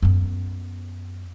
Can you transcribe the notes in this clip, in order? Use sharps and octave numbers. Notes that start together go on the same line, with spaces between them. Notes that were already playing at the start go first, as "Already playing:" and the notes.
F#2 B3